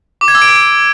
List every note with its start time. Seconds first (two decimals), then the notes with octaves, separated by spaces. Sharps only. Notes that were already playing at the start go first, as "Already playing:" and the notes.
0.21 D6
0.28 G#6
0.35 E6
0.42 D7